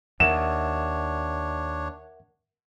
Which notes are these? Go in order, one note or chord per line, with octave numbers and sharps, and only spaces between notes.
D#2 D4 A#4 C#5 E5 F#5 E7